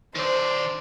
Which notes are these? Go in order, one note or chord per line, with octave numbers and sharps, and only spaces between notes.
D#3 C5 D5